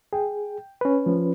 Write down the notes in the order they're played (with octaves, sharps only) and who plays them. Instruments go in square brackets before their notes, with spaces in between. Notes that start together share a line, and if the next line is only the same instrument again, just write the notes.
[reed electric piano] G#4 [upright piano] G5
[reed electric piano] C#4 B4
[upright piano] F3